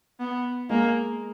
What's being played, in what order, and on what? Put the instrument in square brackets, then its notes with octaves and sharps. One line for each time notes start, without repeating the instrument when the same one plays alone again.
[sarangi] B3
[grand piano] G#3 [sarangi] A#3